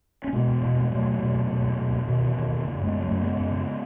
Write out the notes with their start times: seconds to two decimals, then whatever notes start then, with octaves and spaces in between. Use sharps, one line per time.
0.24 C#4
0.33 B2 G#3 B3
0.47 E2
0.62 B2
0.76 E2 G#3
0.90 B2 F#3 A3
1.05 E2
1.19 B2
1.34 E2
1.48 B2
1.63 E2
1.77 B2
1.92 E2
2.06 B2 D#3
2.21 E2
2.36 B2 D#3
2.50 E2
2.65 C#3
2.78 F#2
2.84 G#3 B3
2.93 C#3
3.02 F#3 A3
3.08 F#2
3.21 C#3 G#3 B3
3.37 F#2
3.51 C#3